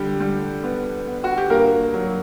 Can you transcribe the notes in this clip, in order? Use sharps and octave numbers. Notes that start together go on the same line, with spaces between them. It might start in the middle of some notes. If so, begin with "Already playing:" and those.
Already playing: D3 G3 G4
G3
B3
B3
F#4
G4
G2 A#3 A#4
F#3